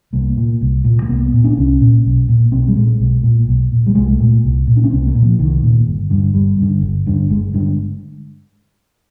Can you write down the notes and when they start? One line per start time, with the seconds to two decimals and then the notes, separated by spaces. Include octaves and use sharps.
0.13 C2 A#3
0.37 A#2
0.61 C2
0.84 A#2
1.02 A#3
1.09 C2 B3
1.33 A#2
1.44 D4
1.57 C2 C#4
1.81 A#2
2.05 B1
2.29 A#2
2.52 B1 C4
2.68 G3
2.75 A#2 G#3
3.00 B1
3.23 A#2
3.47 B1
3.72 A#2
3.86 G3
3.95 C2 G#3
4.11 A3
4.20 A#2
4.44 C2
4.67 A#2
4.77 D4
4.84 C#4
4.90 C2 C4
5.07 A#3
5.15 A#2
5.22 F3
5.39 C2 D#3
5.63 A#2
5.87 G1
6.10 G2 D3
6.34 G1 G3
6.58 G2 D3
6.81 G1
7.06 G2 D3
7.29 G1 G#3
7.54 G2 D3